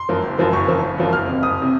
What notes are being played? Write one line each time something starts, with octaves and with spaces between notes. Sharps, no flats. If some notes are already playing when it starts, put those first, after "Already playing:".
Already playing: C6
F#2 F3 A#3
F#1
F#2 F3 A#3
F#1 C#6
F#2 F3 A#3
F#1
F#2 F3 A#3
F#1 F6
F2 C3
F#1 D#6
C3